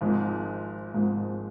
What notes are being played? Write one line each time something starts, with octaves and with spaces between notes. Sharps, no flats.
G#1 G#2 F3 G#3
G#1 G#2 F3 G#3